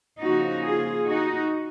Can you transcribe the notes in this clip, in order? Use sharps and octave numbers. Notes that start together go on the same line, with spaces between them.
C#3 F3 A#3 D#4 F#4
F4 G#4
D#4 F#4